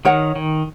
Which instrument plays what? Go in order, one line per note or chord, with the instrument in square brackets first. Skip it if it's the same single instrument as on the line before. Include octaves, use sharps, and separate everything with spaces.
[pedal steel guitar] D#3 [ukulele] A#4 C#5 F#5
[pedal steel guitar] D#3